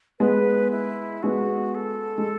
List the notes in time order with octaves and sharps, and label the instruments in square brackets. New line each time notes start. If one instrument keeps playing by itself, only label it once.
[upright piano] G#3 B3 [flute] B4
[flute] E4
[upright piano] G#3 B3 [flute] F#4
[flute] A4
[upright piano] G#3